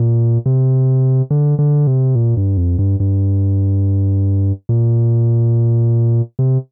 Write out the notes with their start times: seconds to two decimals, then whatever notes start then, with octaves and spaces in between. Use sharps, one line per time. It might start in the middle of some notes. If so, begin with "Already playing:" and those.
Already playing: A#2
0.46 C3
1.31 D3
1.59 D3
1.87 C3
2.15 A#2
2.37 G2
2.57 F2
2.79 G2
3.00 G2
4.69 A#2
6.39 C3